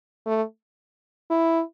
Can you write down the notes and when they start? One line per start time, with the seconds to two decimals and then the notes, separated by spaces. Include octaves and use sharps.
0.26 A3
1.30 E4